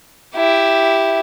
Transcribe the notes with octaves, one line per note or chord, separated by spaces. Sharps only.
E4 G4